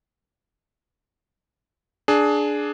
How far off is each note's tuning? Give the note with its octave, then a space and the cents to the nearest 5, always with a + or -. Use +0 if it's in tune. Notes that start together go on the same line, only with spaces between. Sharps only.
D4 +0 G#4 +15